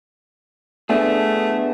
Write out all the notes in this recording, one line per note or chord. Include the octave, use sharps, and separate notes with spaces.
A3 B3 D4 G#4